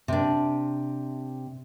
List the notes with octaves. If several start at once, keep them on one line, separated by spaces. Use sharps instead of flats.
C3 D4